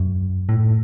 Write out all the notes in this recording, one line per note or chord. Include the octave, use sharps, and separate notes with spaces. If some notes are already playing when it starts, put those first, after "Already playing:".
Already playing: F#2
A2